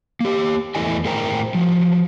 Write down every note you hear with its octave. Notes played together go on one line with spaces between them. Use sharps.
A#3 G4
E2 G#3 A3 E4 D#5 G#5
A2 G#4 A#4 C5 G5 A#5
F3 F#3